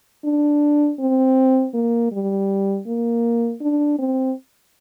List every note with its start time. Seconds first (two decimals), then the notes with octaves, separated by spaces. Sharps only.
0.25 D4
1.00 C4
1.74 A#3
2.12 G3
2.87 A#3
3.61 D4
3.99 C4